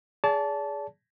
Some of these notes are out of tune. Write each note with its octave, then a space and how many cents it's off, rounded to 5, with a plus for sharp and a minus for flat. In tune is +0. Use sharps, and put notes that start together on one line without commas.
G#4 +0 D5 -40 A5 -10